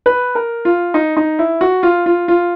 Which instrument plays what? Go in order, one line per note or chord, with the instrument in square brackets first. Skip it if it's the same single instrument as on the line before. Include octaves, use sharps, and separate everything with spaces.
[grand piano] B4
A#4
F4
D#4
D#4
E4
F#4
F4
F4
F4